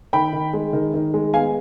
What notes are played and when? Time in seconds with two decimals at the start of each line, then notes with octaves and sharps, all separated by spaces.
0.13 D#3 G5 B5
0.33 D#3
0.53 G#3
0.73 D#3
0.94 D#3
1.14 G#3
1.34 B3 F5 G#5